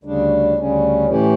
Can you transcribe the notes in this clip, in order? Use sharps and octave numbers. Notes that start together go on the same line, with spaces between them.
D2 C#3 G3 D4
D2 C#3 G3 C#4
A2 E3 A3 C#4 G4